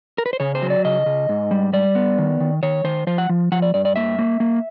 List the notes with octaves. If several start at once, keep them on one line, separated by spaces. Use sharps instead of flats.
A#4
B4
C5
C#3 C#5
C5
F#3
D5
C#3 D#5
C#3
G#2
G3
G3 D5
B3
D#3
D#3
D#3 C#5
D#3 C5
F3 C5
F#5
F3
F3 F#5
D5
G2 D5
D5
A#3 E5
A#3
A#3